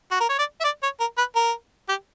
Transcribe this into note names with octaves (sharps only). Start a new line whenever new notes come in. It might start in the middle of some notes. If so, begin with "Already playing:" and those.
F#4
A#4
C#5
D5
E5
D5
C#5
A#4
B4
A#4
G4